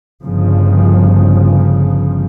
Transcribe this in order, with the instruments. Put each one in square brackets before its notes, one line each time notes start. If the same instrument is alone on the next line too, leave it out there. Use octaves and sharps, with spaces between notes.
[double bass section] G1 C#3 F3